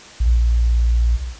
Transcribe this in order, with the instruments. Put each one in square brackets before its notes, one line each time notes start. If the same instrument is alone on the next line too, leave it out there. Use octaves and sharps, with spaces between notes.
[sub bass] A#1